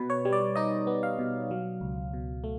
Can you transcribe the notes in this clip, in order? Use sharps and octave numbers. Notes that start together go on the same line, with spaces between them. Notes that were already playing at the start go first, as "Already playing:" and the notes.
Already playing: B2 B3 B4
C#5
G3
D5
D#4 D#5
B3
F5
B2
F#3
C#2
B2
A3